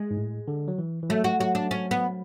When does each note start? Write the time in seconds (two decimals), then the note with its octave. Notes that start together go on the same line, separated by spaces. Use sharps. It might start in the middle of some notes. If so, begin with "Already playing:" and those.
Already playing: G#3
0.11 G#2
0.17 A2
0.48 D3
0.68 F#3
0.78 E3
1.03 E3
1.09 F#3 A3
1.24 F#4
1.40 F#3 F#4
1.55 D4
1.71 C#4
1.91 B3